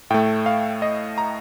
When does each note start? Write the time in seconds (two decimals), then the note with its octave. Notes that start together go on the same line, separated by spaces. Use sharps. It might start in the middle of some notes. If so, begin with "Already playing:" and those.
0.10 A2 A3 G5
0.46 F5
0.82 D#5
1.18 A#5